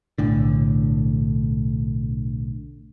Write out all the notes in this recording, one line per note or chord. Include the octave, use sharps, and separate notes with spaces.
B1 A2 D3